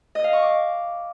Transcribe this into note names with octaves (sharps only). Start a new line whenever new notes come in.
D#5
F5
C#6
D6